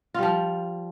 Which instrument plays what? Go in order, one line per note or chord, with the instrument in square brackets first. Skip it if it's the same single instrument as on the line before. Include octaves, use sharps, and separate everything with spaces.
[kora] F4
G3
F3